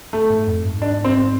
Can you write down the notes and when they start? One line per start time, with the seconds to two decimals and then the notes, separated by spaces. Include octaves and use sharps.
0.13 A3
0.30 G#2
0.47 F2
0.65 G#2
0.82 D4
1.04 C4